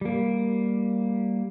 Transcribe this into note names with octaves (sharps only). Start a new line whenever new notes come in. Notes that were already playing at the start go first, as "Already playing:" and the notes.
G3 A#3